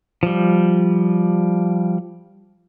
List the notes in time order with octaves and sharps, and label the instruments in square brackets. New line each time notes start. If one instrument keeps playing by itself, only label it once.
[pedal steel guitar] F3 G3